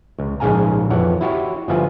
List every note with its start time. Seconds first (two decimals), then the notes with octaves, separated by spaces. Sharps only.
0.19 C#2
0.40 A#1 G#2 C#3 F5 G#5 A#5
0.90 F2 E3 C#5 F#5
1.21 E4 F#4 G4 C#5
1.68 G1 F3 B3 F4 E5 G#5